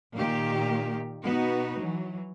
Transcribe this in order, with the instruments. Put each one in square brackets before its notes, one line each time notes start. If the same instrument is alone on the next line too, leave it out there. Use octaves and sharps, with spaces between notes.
[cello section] A#2 D#3 A#3 G4
B2 B3 D#4 F#4
E3 F#3